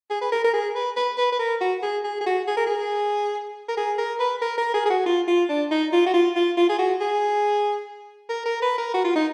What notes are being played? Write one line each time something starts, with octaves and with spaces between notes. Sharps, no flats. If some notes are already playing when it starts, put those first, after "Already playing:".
G#4
B4
A#4
A#4
G#4
B4
B4
B4
B4
A#4
F#4
G#4
G#4
G#4
F#4
G#4
A#4
G#4
A#4
G#4
A#4
B4
A#4
A#4
G#4
G#4
F#4
F4
F4
D4
D#4
F4
F#4
F4
F4
F4
G#4
F#4
G#4
A#4
A#4
B4
A#4
F#4
F4
D#4